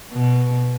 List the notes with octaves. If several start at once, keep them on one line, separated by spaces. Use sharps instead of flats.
B2